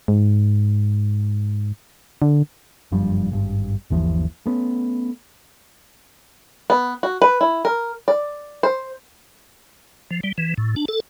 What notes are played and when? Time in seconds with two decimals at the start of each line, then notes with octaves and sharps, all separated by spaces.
0.08 G#2
2.22 D3
2.92 F#1 G2 F3 G3
3.32 G#1 G2
3.90 G1 D#2 E3 F3
4.46 A3 B3 C#4
6.70 B3
7.03 F#4
7.22 B4
7.41 E4
7.65 A#4
8.08 D5
8.63 C5
10.11 F3
10.23 G3
10.38 E3
10.58 A2
10.76 D4
10.88 A4